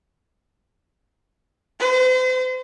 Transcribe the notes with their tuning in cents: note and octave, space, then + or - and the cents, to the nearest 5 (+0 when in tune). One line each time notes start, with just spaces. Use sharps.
C5 -40